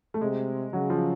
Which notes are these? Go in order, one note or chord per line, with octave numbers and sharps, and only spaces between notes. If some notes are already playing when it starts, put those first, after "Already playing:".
A3
C3 G#3
C#3 F#3
F3